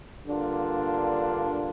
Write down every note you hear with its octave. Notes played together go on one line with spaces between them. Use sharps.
G2 D3 A#3 D4 F4